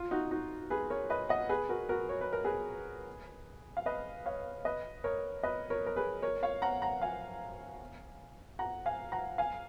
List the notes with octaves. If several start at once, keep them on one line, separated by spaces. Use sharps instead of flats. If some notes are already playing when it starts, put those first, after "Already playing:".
Already playing: F4
D#4 F#4
D#4 F#4
G#4 B4
A#4 C#5
B4 D#5
D#5 F#5
G#4 B4
F#4 A#4
F#4 A#4
C#5
B4
A#4
G#4 B4
F5
B4 D#5
C#5 F5
B4 D#5
A#4 C#5
B4 D#5
A#4 C#5
A#4
G#4 B4
A#4 C#5
C#5 F5
F#5 A#5
F#5 A#5
F5 G#5
F#5 A#5
F5 G#5
F#5 A#5
F5 G#5